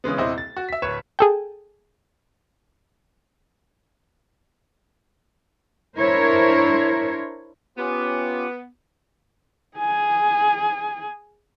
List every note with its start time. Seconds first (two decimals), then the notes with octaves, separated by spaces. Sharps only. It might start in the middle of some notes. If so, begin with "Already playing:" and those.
0.04 C#3 E3 G#3 B3
0.18 D#1 C3 E4 C5 D#5
0.38 A6
0.57 F#4
0.69 E5 B6
0.82 D1 B4 C#5 E7
1.19 G#4 A4 G5
5.98 D4 E4 A#4 C5 C#5
7.78 B3 C#4 F4 G4
9.77 G#4 G#5